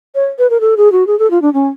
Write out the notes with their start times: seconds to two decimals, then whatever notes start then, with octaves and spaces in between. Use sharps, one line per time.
0.15 C#5
0.39 B4
0.50 A#4
0.61 A4
0.77 G#4
0.92 F#4
1.07 G#4
1.19 A4
1.31 F4
1.42 D4
1.54 C#4